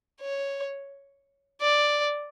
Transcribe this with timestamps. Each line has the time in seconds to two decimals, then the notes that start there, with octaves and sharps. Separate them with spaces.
0.21 C#5
1.61 D5